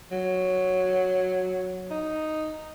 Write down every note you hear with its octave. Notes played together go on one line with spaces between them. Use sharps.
F#3
D#4